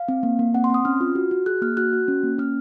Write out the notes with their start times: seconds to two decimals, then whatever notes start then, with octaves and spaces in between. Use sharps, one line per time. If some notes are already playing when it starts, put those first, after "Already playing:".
Already playing: F5
0.08 C4
0.23 A#3
0.39 A#3
0.54 C4 F#5
0.64 C6
0.70 C4 D#6
0.85 C#4 F6
1.00 F4
1.15 F#4
1.31 F#4
1.46 G#4 F#6
1.62 A#3 F6
1.77 F#4 F#6
1.93 F#4
2.08 C#4
2.23 A#3
2.38 C#4 F6